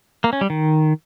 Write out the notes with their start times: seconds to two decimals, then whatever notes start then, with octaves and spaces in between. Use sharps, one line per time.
0.24 A#3
0.33 C#4
0.41 G3
0.50 D#3